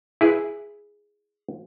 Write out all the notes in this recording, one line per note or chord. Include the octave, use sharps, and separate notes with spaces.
E4 G#4 B4